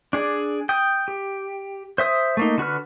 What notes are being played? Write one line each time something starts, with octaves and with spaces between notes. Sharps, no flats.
D4 G#4 D5
G5 D#6
G4
C5 E5 D#6
A3 A#3 D#4
D3 F#4 B4 F6